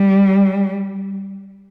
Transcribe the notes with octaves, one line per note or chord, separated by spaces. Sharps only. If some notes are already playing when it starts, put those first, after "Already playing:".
Already playing: G3